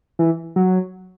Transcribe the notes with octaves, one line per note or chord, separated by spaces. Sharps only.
E3
F#3